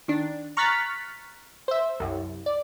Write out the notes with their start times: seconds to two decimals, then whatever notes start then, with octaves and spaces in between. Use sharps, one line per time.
0.08 D#3 D4
0.57 A#5 C#6 F6 F#6 A6 B6
1.68 C5 E5
2.00 C2 F#2
2.46 D5